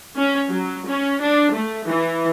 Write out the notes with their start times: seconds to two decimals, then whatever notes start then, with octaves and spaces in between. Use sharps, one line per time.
0.18 C#4
0.50 F#3
0.88 C#4
1.21 D4
1.54 A3
1.88 E3